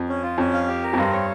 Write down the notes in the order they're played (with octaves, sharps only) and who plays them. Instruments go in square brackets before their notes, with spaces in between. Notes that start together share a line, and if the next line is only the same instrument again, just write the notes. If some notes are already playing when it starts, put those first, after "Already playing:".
Already playing: [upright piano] F2
[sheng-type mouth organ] C#4
F4
[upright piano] F2 [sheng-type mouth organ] C#4
[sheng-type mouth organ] F5
G4
A#4
[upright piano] F2
[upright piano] G2 [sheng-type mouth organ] C4
[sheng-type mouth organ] C#5